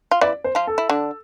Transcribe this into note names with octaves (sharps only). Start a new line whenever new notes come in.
F4
E3 E4 D5
C5
F3 F4
A4
E4
D3 D4